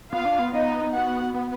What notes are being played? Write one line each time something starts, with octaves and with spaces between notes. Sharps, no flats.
B3 F4 F5
D4
B3
B3 D#4 D#5
F#4 F#5
B3